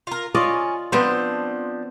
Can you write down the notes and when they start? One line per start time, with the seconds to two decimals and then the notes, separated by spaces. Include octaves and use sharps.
0.07 F4 A#4
0.35 C#4 F4 D5 D#5
0.92 F3 B3 C4 D4 C5